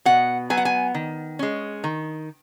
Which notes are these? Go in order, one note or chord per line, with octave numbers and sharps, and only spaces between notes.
B2 F#5
F#3 B3 G#5
F#5
G#5
D#3
G#3 C#4
D#3